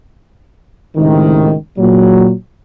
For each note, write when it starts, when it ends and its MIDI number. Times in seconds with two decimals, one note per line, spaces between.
0.97 1.53 37
0.97 1.53 45
0.97 1.53 48
0.97 1.53 51
1.78 2.32 46
1.78 2.32 54